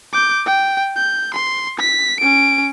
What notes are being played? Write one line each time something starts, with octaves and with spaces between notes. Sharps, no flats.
D6 G6
G5
G6
C6
B6
C#4 D7